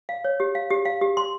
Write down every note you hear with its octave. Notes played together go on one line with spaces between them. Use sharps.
F5
C#5
G4
F5
G4
F5
G4
C6